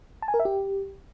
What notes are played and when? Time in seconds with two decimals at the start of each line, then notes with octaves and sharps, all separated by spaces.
0.22 A5
0.28 G#5
0.34 A#4
0.40 E5
0.45 G4